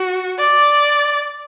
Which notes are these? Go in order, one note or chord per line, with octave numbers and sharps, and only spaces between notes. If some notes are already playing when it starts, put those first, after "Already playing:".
Already playing: F#4
D5